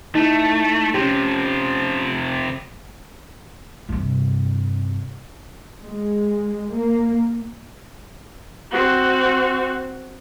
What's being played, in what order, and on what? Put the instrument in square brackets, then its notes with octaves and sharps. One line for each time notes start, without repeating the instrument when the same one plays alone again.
[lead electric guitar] A3 [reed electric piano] D#4 E4
[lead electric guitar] C3 F3 [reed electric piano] C#4 G4
[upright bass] G2 C3
[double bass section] G#3
A#3
[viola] C4 F#4